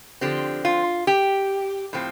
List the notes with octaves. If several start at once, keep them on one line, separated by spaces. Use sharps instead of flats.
D3 F3 C4 G4
F4
G4
A2 F3 C4